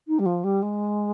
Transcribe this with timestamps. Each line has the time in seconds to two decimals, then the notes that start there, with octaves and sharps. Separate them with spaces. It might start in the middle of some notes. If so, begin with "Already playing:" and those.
0.08 D#4
0.19 G3
0.26 F3
0.44 G3
0.62 G#3